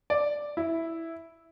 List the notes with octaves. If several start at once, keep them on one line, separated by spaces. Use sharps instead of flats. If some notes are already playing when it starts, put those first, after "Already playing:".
D5
E4